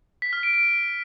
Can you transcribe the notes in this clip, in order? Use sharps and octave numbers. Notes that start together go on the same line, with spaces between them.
B6
F6
D7
D7